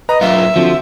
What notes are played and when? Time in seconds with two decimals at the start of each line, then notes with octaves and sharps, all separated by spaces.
0.09 B4 D#5 A#5
0.22 B1 F4 E5
0.56 D3 F3 C4 F#4